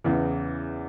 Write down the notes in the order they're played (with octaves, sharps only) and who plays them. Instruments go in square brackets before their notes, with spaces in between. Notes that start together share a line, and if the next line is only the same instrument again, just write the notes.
[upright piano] E2 C#3 E3